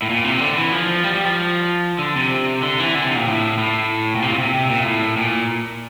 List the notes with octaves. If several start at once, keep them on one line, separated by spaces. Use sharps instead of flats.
A2
A#2
C3
D3
E3
F3
G3
G3
F3
D3
C3
D3
E3
D3
C3
A#2
A2
A2
A#2
C3
A#2
C3
C3
A#2
A2
A#2